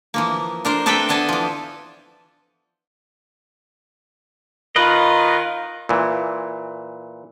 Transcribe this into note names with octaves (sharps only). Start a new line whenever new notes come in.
E3 F3 A#3
D4 A#4 C5
C4 D4 A4 B4 E5 G5
B3 D4 A4 G#5 A5
E3 F3
D#3 F4 B4 D#5
A#2 E3